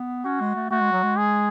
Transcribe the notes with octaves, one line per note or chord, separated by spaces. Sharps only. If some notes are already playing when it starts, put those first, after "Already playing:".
Already playing: B3
C#4 F#4
G#3
A3
A3 F#4
G#3
F#3
G#3
G#4